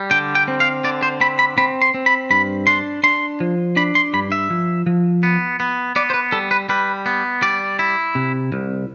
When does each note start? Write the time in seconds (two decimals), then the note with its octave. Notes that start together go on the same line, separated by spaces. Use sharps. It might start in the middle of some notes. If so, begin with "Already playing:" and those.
Already playing: G3
0.11 D3 G5
0.35 G5
0.48 C4
0.60 F5
0.84 D3 D5
1.03 C5
1.21 C4 B5
1.39 B5
1.58 C4 B5
1.82 C6
1.94 C4
2.06 B5
2.30 G2 B5
2.67 D4 C6
3.03 D4 C6
3.40 F3
3.76 D4 B5
3.95 C6
4.13 G2 B5
4.32 E5
4.50 F3
4.86 F3
5.23 B3
5.60 B3
5.96 B3 D5
6.10 C5
6.14 B4
6.32 G3 A4
6.51 B4
6.69 G3 B4
7.06 B3
7.42 G3 D5
7.79 E4
8.15 C3
8.52 C2